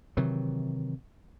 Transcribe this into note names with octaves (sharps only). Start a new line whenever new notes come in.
C3 D#3 E3 F#3